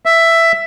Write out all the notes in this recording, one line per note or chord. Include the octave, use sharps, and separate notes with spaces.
E5